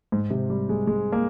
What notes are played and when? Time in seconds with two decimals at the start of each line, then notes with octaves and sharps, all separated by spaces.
0.12 G#2
0.30 C3
0.50 G3
0.69 G#3
0.87 G#3
1.12 A#3